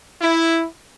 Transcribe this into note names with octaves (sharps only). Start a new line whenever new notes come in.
E4